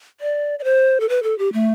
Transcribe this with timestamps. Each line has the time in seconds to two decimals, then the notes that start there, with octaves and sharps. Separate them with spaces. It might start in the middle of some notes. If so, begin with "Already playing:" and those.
0.20 D5
0.59 D5
0.64 C5
1.00 A4
1.09 B4
1.23 A4
1.38 G4
1.53 A3